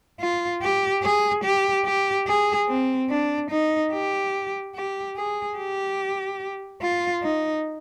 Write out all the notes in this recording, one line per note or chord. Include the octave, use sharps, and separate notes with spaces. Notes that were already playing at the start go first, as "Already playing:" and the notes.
F4
G4
G#4
G4
G4
G#4
C4
D4
D#4
G4
G4
G#4
G4
F4
D#4